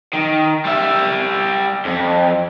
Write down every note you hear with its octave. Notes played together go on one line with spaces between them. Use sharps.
D#3
G3 E5
F2